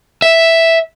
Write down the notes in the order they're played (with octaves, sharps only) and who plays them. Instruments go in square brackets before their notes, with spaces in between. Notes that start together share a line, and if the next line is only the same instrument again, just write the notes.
[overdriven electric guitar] E5